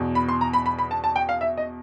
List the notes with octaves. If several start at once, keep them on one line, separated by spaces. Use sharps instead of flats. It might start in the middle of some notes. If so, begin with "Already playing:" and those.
Already playing: E2 B2
B5
C6
A#5
B5
B5
B5
A5
A5
G5
F5
E5
D#5